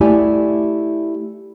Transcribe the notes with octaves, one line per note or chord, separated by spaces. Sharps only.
A3 E4 G4 D5 G#5